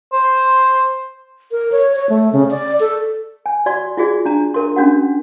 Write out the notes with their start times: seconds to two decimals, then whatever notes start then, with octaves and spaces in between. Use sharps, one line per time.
0.13 C5
1.51 A#4
1.72 C#5
1.96 C#5
2.09 A3
2.33 C#3
2.51 D5
2.80 A4
3.46 G#5
3.66 F#4 D5 C6
3.97 F4 F#4 G#4 D5
4.25 D4 A#5
4.54 A#4 C6
4.76 C#4 D4 F#4 F#5